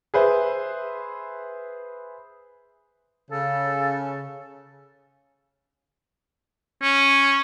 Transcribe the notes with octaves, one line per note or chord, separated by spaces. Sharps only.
G#4 B4 C5 E5
C#3 A4
C#4